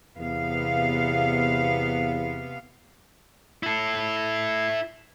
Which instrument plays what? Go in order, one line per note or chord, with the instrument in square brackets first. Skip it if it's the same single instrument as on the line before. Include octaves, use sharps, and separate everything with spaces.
[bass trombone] E2 [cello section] C3 B3 F5
[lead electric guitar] E4 A4